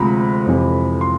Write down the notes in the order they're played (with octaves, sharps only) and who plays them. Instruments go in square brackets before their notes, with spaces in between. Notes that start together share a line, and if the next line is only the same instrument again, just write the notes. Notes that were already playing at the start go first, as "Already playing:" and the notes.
Already playing: [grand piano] D2 C3 F3 G#3 A#5 B5
F2 C3 E3
C6